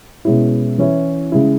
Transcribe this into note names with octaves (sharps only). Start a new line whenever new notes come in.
B2 G#3 C#4 E4
E3 C#4 E4
C#3 G#3 E4